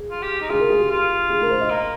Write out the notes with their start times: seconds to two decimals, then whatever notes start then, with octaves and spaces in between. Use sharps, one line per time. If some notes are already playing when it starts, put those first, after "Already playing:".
Already playing: G#4
0.10 F4
0.22 G4
0.41 D#4
0.50 F4 G#4
0.59 A#4
0.70 G#4
0.80 G4
0.90 F4
1.30 G#4
1.41 A#4
1.50 C5
1.60 D#5
1.71 A#3